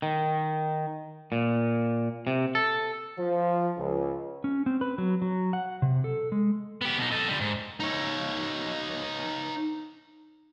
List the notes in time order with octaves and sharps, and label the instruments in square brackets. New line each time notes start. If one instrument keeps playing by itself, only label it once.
[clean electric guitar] D#3
A#2
C3
A4
[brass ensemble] F3
C#2
[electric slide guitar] C#4
C4
B4
F#3
F#3
F#5
C3
A4
G#3
[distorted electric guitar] B3 G4
B2 D#4
A4 D#5
D3 G3
G#2
D#4 C#5